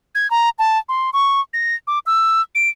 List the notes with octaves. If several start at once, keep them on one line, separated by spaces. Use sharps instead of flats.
G#6
A#5
A5
C6
C#6
A#6
D6
E6
D7